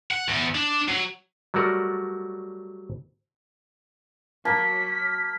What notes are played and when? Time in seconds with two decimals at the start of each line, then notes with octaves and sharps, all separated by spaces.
0.11 F#5
0.29 E2
0.55 D4
0.88 F#3
1.54 F#3 G3 A3 F#4 A#4 D5
4.45 F#3 A#3 A5 B6